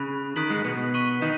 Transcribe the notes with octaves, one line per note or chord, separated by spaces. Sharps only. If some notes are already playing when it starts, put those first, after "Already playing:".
Already playing: C#3 B5 F#6
D#3 D#6 F#6 B6 F#7
G#2 G#3
B2 B3
C#6 B6 D#7 F#7
D#3 D#4